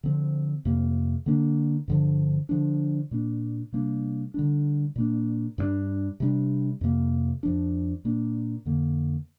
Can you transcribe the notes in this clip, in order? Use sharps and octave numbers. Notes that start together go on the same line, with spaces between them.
D3 F3 C4
F2 C3 A#3
D3 A#3 D4
G2 D3 F3
D3 F3 D4
A#2 A#3 D4
C3 G3 A#3 D4
D3 G3 D4
A#2 A#3 D4
G2 G3 A#3 D4
C3 G3 D4
F2 C3 A#3
F2 F3 D4
A#2 A#3 D4
F2 D3 A#3